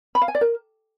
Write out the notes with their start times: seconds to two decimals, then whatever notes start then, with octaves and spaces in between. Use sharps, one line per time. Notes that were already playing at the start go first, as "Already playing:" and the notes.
0.15 B5
0.22 F5
0.28 G#5
0.35 D5
0.41 A#4